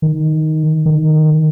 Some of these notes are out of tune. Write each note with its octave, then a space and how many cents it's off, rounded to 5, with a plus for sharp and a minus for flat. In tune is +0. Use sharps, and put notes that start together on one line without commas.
D#3 +5
D#3 -5